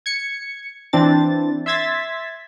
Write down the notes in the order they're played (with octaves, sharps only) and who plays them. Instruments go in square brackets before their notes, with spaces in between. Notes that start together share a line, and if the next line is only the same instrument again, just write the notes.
[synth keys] G#6 C#7
E3 C4 D4 A6
E5 C6 E6 G#6 A6 B6